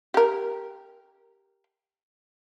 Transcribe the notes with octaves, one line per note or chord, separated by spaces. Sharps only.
G4 A#4